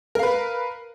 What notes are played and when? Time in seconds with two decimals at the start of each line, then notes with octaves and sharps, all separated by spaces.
0.15 A#4
0.19 F5
0.23 B4